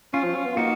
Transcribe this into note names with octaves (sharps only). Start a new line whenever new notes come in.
C#4 F4
F3
C#4
B3
A#3 D#4 F#4